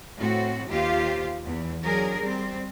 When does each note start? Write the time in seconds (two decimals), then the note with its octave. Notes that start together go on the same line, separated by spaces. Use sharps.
0.17 A2 C4 F#4
0.69 D#2 F4 G4 C5 F5
1.44 E2
1.82 F#3 D4 G#4 A#4
2.21 G3 C4